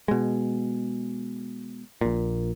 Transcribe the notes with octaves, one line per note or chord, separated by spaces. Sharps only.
B2 G#3
A#1 A#2